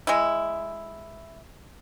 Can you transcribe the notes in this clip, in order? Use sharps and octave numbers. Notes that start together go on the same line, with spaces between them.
G#3 E4